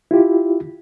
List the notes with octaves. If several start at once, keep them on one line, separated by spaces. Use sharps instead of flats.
E4 F4 G4